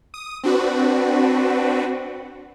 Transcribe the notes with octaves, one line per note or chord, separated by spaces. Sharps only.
D#6
C4 D4 F#4 B4